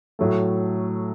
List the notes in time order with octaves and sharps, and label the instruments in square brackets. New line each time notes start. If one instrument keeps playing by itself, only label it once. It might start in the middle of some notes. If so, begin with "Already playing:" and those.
[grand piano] A2 F#3 A3